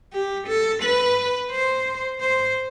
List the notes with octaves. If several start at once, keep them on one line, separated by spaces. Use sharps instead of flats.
G4
A4
B4
C5
C5